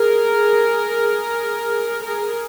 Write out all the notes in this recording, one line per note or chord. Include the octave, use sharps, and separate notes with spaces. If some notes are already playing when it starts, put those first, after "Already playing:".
Already playing: G#4 A#4
G#4 A#4